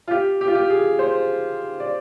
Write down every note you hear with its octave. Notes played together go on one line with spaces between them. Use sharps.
F4
G4
G4
F4
G4
G#4
C5
D5